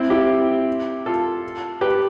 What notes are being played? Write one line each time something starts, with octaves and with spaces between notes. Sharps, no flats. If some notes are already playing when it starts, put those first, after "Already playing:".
Already playing: C4 E4
E4 G4
F4 A4
G4 B4